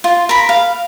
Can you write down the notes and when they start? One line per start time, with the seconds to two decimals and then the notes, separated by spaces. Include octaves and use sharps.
0.04 F4
0.29 A#4 B5
0.49 F5